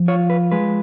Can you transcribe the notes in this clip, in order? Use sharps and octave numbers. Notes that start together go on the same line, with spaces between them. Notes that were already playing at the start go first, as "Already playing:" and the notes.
Already playing: F3
F4 C#5
B4
G#3 B4